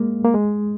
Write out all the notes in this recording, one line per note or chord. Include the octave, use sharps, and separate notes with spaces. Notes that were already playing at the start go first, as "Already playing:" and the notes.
Already playing: G#3 A#3
A#3
G#3